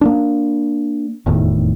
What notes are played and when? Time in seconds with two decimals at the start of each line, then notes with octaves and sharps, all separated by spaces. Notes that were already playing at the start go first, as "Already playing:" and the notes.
0.01 A#3 B3 D4
1.26 F1 E2 A2 D#3